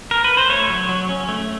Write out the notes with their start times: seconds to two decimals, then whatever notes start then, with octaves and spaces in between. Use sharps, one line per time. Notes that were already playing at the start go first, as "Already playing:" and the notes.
0.11 A#4
0.24 B4
0.37 C5
0.50 A3 C#5
0.70 F#3
0.89 F#3
1.09 C#4
1.29 A3